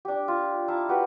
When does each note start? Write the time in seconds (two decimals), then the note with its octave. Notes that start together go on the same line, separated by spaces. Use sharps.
0.05 D4 G4
0.28 F4
0.68 E4 F5 A5 A#5
0.89 F#4 G4 B4 G5